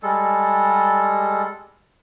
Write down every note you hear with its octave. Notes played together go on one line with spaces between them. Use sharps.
G3 G#3 A4